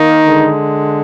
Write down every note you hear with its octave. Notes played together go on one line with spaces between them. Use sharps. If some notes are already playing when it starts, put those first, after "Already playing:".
Already playing: D#3 A#3 D#4
D3 G#3